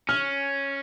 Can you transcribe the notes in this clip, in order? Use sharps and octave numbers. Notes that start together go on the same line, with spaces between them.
C#4 F6